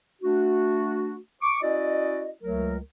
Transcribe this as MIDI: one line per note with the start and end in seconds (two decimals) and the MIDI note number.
0.22 1.17 57
0.22 1.17 62
0.22 1.17 66
1.42 1.61 85
1.42 1.61 86
1.63 2.30 61
1.63 2.30 64
1.63 2.30 66
1.63 2.30 74
1.63 2.30 75
2.43 2.77 37
2.43 2.77 54
2.43 2.77 57
2.43 2.77 70